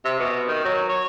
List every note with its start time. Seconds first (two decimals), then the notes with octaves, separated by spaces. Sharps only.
0.05 C3
0.19 B2
0.48 D#3
0.65 F#3
0.88 C#5